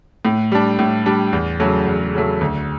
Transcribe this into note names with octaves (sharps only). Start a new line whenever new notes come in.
A2
G3 D4
A2
G3 D4
E2
C#3 F#3 A3
E2
C#3 F#3 A3
D2